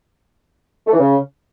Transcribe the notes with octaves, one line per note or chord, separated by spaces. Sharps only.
A3
E3
C#3